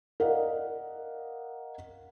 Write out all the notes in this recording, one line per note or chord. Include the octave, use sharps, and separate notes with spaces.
A#4 D5 D#5 F5 F#5